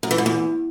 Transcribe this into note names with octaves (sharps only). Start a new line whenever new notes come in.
F#2
E3
G#2
E2